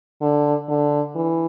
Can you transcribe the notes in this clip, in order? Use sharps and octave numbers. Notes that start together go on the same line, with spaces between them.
D3
D3
E3